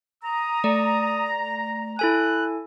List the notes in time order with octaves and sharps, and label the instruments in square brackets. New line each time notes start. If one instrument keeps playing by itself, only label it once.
[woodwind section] A#5 [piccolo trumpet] D#6
[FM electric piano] A3 [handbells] D5
[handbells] E4 A4 G#5 [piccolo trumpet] F#6